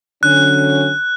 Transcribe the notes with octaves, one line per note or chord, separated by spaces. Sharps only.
D3 F#3 C#4 F#6